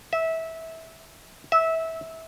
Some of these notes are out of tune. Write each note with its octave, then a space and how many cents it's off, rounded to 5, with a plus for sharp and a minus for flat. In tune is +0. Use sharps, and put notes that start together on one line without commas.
E5 -20
E5 -20